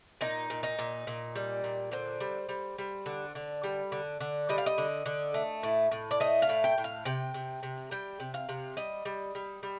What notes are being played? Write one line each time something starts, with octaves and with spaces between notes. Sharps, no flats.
A#2 D#4
A#2
D#4
A#2
A#2
G3
A#2
D3 C5
G3
G3
G3
D3
D3
G3
D3
D3
G3 D#5
F5
D#5
D3
D3
A3
A2
A2
D5
A3 D#5
F5
A2
G5
A2
F5
C3 G5
C3
C3
G3 G5
C3
F5
C3
G3 D#5
G3
G3
G3